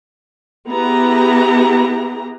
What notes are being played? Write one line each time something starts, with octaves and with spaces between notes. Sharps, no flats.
B3 E4 G4 G#4 A#5